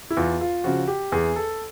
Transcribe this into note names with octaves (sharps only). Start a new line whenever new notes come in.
E4
E2 F4
F4
C#3 F3 F#4
G4
E2 G#4
A4